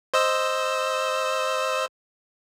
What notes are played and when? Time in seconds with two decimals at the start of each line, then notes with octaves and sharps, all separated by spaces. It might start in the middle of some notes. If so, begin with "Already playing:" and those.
0.14 C5 D#5 E6